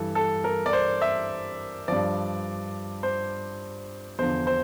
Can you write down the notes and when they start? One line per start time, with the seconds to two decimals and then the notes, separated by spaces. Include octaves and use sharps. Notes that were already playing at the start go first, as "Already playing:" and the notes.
Already playing: G2 E3 A4
0.15 A4
0.44 A#4
0.66 D5
0.73 C5
1.02 E5
1.88 G2 F3 D5
3.03 C5
4.19 E2 D3 F3 C5
4.47 C5